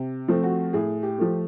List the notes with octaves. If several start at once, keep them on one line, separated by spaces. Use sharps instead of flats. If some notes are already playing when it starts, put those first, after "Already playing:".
Already playing: C3
F3 A3 C4
F#4
A2 G#4
G4
F3 A3